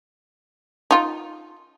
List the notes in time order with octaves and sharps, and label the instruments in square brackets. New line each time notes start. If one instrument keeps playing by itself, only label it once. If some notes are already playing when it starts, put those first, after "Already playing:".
[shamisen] D#4 F4